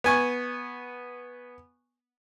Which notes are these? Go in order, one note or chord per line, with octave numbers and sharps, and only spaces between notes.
B3 G#5 C#6